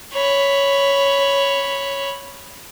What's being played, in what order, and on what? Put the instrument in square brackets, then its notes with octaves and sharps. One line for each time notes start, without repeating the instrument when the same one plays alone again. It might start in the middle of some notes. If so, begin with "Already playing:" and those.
[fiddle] C#5 B5